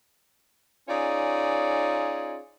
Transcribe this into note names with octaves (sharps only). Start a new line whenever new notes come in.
C#4 D#4 F4 G#4 C#5 D5